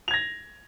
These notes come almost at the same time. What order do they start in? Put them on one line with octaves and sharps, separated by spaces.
F7 G#6 A#6